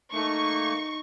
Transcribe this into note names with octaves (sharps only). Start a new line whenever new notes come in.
A3 A#3 D#4 C#6